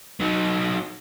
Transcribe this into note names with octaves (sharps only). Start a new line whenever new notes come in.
F#3 D#4